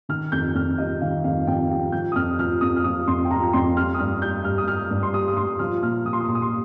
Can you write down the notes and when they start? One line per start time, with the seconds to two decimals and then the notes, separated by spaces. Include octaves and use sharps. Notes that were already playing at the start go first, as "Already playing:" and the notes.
0.09 D#3 F6
0.32 F2 G6
0.55 F2 F6
0.78 G3 D#5
1.01 D#3 F5
1.24 F2 F5
1.47 F2 G5
1.70 G3 F5
1.92 F3 G6
2.12 D#6
2.16 F2 F6
2.39 F3 F6
2.61 F2 D#6
2.76 F6
2.84 F3 D#6
3.07 F2 C6
3.25 G5
3.31 F3 A#5
3.53 F2 C6
3.76 G3 F6
3.94 D#6
3.99 G2 F6
4.22 G3 G6
4.44 G2 F6
4.58 D#6
4.68 G3 F6
4.90 G2
5.03 C6
5.13 G3 D#6
5.28 D#6
5.36 G2 C6
5.59 F3 F6
5.82 A#2 F6
6.05 F3 D#6
6.13 C6
6.20 D#6
6.28 A#2 C6
6.35 D#6
6.42 C6